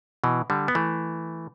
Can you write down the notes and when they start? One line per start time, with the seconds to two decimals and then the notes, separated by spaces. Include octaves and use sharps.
0.24 B2 E3
0.50 D3 G3
0.68 B3
0.75 E3 A3